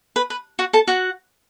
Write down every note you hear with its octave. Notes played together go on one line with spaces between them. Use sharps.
B4
B4
F#4 F#5
A4 A5
F#4 F#5